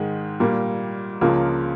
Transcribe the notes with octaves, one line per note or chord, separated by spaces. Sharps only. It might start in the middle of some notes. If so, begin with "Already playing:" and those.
Already playing: G#2 D#3 G#3
A#2 G3 A#3
C#2 C#3 F3 A#3 F4